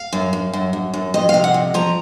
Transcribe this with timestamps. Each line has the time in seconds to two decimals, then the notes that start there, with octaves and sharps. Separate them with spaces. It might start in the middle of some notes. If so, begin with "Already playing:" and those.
Already playing: F5
0.13 F#2
0.33 F#2
0.53 F#2
0.73 F#2
0.94 F#2
1.14 F2 D#5
1.29 F5
1.34 C3
1.44 F#5
1.54 F2
1.74 F3 A#5